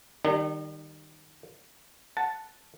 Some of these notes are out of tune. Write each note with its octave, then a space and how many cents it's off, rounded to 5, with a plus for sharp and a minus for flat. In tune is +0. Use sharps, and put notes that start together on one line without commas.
D#3 -15 G3 +0 D#4 -45
F#5 +0 A5 +0